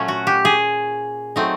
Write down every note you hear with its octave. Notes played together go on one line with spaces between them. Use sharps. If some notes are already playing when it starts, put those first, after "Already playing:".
Already playing: A#2 F#3 A3 C#4
F#4
G4
G#4
F#3 A3 C4 D#4